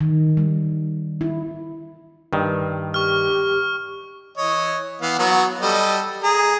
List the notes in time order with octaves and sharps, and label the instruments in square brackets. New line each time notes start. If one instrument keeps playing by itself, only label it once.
[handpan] D#3
G3
E4
[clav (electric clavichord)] G2 D#3
[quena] G4 [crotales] C#6 F6
[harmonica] E3 C#5 D#5
E3 B3 F5
F#3 B3 F#4
G3 A4 D#5
G#4 A#5